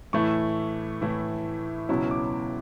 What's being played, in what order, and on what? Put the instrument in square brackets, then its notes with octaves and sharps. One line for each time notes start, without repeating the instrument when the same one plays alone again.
[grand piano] A2 E3 A3 E4 C#6
A2 E3 A3 E4
C#2 B2 F#3 C#4 E4 C#6
D6